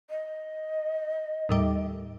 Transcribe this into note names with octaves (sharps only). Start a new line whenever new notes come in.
D#5
D#2 A2 G3